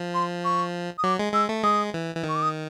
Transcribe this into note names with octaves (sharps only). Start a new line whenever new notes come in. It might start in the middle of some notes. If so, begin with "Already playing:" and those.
Already playing: F3
C6
C#6
D#6
F#3 D6
G#3
G#3 E6
A3
G#3 D#6
E3
E3
D#3
C#6
D6
D#6